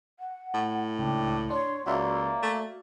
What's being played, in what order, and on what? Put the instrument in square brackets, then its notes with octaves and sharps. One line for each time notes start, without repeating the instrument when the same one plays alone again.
[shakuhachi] F#5
[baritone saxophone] A2
[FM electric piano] C#2 [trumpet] D4 [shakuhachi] G5
[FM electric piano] D4 [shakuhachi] C#5 [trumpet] C6
[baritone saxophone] C#2 [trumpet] A#3 [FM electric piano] F#4 E5 F5 [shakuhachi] D5
[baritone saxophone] A3